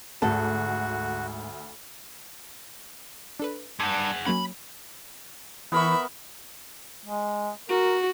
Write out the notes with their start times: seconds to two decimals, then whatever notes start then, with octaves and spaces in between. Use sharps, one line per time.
0.22 D2 G#2 F#4 A4 A5
3.40 D4 A4 B4
3.80 G2 G#4 F#5
4.26 F#3 A#3 C#4 B5
5.72 E3 B3 A#4 E5 B5 C#6
7.05 G#3
7.69 F#4 A#4